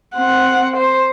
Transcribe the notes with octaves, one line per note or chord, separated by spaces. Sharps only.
C4 F#5
C5